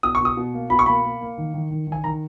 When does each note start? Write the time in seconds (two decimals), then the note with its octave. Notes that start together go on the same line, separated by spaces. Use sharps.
0.03 B2 D#6
0.15 C#6
0.21 B2 D#6
0.37 B2
0.53 A#3
0.70 B2 B5
0.79 C#6
0.86 A#3 B5
1.04 A#3
1.21 A#3
1.37 D#3
1.54 D#3
1.71 D#3
1.87 D#3
1.92 G#5
2.04 D#3 A#5